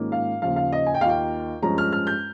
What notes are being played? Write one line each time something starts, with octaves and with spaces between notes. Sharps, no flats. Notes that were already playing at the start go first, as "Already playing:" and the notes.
Already playing: G#2 D#3 A#3 C#4 F4
F5
D#2 C#3 F3 F5
F5
D#5
G#5
G5
D#2 D#3 A#3 F4 F5
G5
G2 F3 G#3 C#4 A#5
F6
F6
G6